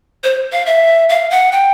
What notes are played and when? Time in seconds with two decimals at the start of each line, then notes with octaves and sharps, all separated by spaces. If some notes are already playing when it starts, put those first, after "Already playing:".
0.24 C5
0.52 F5
0.66 E5
1.09 F5
1.30 F#5
1.52 G5